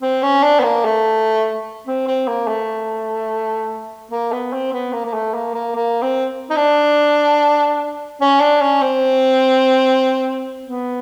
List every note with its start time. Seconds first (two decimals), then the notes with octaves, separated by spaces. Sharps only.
0.02 C4
0.23 C#4
0.43 D4
0.59 B3
0.63 A#3
0.84 A3
1.87 C4
2.07 C4
2.27 A#3
2.48 A3
4.11 A#3
4.32 B3
4.52 C4
4.73 B3
4.93 A#3
5.05 A#3
5.14 A3
5.34 A#3
5.54 A#3
5.75 A#3
6.02 C4
6.50 D#4
6.56 D4
8.21 C#4
8.41 D4
8.61 C#4
8.81 C4
10.66 B3